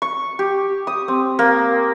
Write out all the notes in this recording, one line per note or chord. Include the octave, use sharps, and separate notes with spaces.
C#6
G4
D#6
C4
A#3